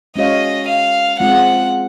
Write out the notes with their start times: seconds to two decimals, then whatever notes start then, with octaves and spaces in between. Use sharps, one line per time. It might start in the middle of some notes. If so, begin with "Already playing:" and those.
0.16 G#3 C#4 F#4 C#5 D#5 F5
0.68 F5
1.20 G#3 C4 F4 F#5